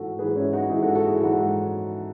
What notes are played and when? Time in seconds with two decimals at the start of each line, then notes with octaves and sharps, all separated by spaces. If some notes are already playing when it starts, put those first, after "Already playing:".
Already playing: G#2 E3 F#4 A4
0.19 G#2 E3 G#4 B4
0.36 C#4 E4
0.53 D#4 F#4
0.69 G#2 E3 E4 G#4
0.82 F#4 A4
0.95 F#4 A4
1.07 E4 G#4
1.20 E3 F#4 A4
1.24 G#2
1.32 D#4 F#4